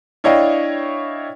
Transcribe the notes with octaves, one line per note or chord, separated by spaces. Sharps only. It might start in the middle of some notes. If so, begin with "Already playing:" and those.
D4 E4 C#5 D#5 F5 G5